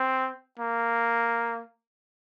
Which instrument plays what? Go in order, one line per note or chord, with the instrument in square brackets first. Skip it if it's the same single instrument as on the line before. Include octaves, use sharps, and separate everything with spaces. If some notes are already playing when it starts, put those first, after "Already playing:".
Already playing: [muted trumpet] C4
A#3